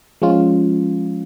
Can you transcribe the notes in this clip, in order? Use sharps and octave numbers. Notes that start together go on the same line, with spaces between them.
F3 G#3 C#4 F4